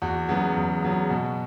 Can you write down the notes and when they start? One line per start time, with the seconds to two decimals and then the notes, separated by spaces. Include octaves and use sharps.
0.02 E2 F#4
0.29 C#3 F#3 B3
0.56 E2
0.83 C#3 F#3 B3
1.10 B2 F#4